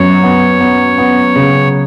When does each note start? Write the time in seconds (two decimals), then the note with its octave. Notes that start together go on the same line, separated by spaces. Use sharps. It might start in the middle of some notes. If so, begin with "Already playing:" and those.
Already playing: F#2 B3 C#5
0.23 B3
0.61 B3
0.98 B3
1.36 C#3